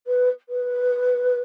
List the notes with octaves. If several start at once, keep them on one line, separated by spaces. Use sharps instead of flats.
B4
B4